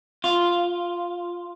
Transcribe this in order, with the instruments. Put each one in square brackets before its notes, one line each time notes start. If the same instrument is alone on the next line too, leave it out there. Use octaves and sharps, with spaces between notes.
[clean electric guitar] F4